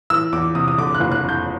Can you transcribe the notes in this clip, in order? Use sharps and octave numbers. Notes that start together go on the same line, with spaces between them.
E3 E6
E2 D6
C3 D#6
D#6
D3 D6
F#6
F#1
F#6
F2
G6